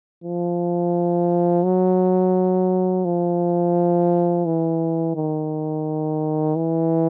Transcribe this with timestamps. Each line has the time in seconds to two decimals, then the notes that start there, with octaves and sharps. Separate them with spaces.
0.24 F3
1.65 F#3
3.05 F3
4.46 E3
5.15 D#3
6.56 E3